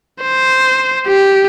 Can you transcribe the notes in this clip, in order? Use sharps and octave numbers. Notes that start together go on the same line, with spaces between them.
C5
G4